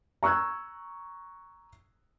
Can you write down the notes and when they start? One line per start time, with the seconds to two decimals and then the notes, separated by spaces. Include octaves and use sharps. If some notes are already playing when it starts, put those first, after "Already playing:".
0.23 A#5 C#6 E6 F#6 G#6